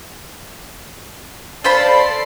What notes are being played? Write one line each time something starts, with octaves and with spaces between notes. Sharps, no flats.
F4 A4 C5 D5 B5 C7